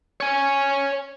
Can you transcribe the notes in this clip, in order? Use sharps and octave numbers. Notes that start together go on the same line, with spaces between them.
C#5 G#5